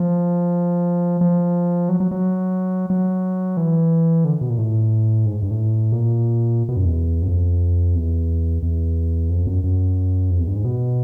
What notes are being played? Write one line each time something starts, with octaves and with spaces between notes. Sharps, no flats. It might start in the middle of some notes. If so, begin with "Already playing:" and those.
Already playing: F3
F3
F#3
F#3
F#3
F#3
E3
D3
B2
A#2
A2
G#2
G2
A2
A#2
B2
F#2
E2
F#2
F2
E2
E2
F2
F#2
F#2
F2
E2
G2
G#2
B2